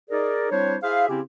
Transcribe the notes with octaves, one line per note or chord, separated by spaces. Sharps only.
D#4 G#4 A#4 D5
G3 C4 D4 E4 C5 C#5
E4 G#4 C5 E5 F5
C#3 C4 C#4 E4 G4